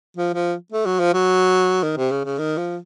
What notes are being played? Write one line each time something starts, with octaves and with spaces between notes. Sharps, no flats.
F3
F3
A3
F#3
F3
F#3
D#3
C3
C#3
C#3
D#3
F3